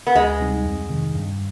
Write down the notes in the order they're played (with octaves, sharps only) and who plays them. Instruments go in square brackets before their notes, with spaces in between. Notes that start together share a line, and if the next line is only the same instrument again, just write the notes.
[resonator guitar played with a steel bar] B3
[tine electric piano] D2 [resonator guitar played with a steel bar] G#3
[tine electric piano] C3 G3 C4 D#4
F2
C3 D#3
G2